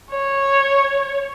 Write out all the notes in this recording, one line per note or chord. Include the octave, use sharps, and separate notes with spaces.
C#5